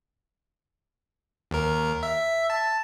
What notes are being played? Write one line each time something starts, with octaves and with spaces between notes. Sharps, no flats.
D#2 A#4
E5
A5